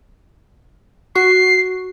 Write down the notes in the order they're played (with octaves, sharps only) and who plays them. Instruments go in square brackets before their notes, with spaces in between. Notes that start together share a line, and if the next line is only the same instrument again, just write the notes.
[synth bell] F#4 C#6 [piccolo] C7